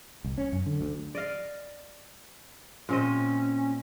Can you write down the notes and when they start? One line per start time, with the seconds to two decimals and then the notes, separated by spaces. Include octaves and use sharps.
0.24 C2
0.38 C#4
0.52 F#2
0.66 D3
0.81 D2
1.15 D5 D#5 F5
2.89 A#2 C4 C#4 D#5